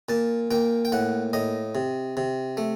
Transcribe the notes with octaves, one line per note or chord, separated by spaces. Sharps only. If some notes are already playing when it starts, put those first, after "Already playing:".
A#2 A5
A#2 G5
G5
A2 F#5
A2 D#5
C3
C3
A3